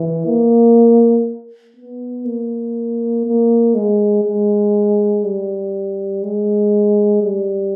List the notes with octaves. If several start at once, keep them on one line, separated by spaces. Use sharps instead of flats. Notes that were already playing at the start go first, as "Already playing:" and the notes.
Already playing: E3
A#3
B3
A#3
A#3
G#3
G#3
G3
G#3
G3